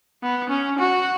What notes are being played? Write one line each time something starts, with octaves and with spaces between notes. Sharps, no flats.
B3
C#4
F#4